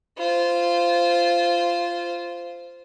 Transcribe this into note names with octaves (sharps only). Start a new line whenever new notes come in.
F4 C5